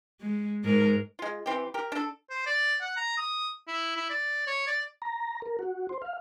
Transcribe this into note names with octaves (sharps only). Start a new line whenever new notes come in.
G#3
G#2 G#3 A#4
G#3 F4
E3 C4 G4
G4 A#4
D4 A4
C5
D5
F#5
A#5
D#6
E4
E4
D5
C#5
D5
A#5
A#4
F#4
C5
F5